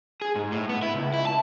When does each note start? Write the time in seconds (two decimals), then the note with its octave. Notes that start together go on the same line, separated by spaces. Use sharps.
0.22 G#4
0.35 G#2
0.52 A2
0.69 B3
0.83 E4
0.95 C#2
1.14 E4
1.27 A5